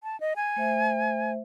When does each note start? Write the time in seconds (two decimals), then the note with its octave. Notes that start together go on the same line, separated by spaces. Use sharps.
0.03 A5
0.20 D#5
0.36 G#5
0.56 A3 C5 E5